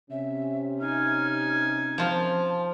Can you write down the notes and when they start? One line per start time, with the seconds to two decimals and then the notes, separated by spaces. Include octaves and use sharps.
0.11 C3 C#4 E5
0.80 D#4 G#5 F6
1.98 F3 F4 A5